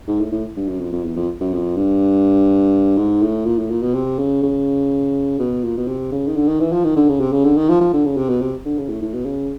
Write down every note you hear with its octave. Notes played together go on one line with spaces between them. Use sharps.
G#2
A2
A2
G2
F#2
F2
F2
E2
F2
F#2
F2
G2
G#2
A2
A#2
A2
A#2
B2
C3
C#3
C#3
B2
A#2
B2
C3
C#3
D#3
D3
D#3
E3
F3
D#3
D3
C#3
C3
C#3
D3
D#3
F3
F3
D3
C#3
C3
B2
C3
D3
C#3
A2
A2
B2
C#3